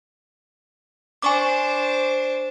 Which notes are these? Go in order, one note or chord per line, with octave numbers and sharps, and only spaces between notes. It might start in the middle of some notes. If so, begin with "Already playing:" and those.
D4 C5 G#5 C#6 D6